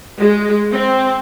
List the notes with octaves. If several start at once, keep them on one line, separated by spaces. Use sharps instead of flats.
G#3
C4